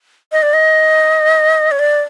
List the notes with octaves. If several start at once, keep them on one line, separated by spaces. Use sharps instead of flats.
D#5
D5
D#5
C#5
D5